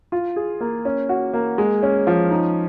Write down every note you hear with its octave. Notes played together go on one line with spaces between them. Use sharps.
F4
G#4
A#3
C#4
F#4
A#3
G#3
C#4
F3
D#4